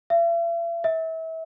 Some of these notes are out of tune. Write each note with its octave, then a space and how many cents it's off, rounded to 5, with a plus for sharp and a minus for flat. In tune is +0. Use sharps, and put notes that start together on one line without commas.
E5 +45
E5 -30